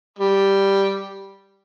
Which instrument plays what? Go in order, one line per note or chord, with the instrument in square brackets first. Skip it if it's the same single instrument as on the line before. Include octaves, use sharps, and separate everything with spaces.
[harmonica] G3